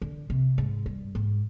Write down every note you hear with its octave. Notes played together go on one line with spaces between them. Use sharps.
D3
C3
G#2
G2
G#2